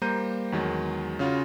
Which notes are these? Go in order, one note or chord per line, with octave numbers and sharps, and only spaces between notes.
G3 A#3 C5 A#5 G6 D#7
E2 D#3 F#3 G#3
C#3 C#4 F4 F#4